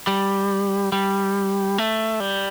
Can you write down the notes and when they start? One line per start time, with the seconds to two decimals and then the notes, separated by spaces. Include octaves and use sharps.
0.07 G3
0.92 G3
1.78 A3
2.20 G3